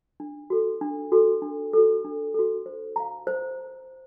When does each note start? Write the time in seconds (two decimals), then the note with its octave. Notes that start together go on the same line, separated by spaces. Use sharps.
0.20 D4
0.50 F#4 A4
0.81 D4
1.12 F#4 A4
1.42 D4
1.73 F#4 A4
2.05 D4
2.34 F#4 A4
2.66 C5
2.96 F5 A#5
3.27 C5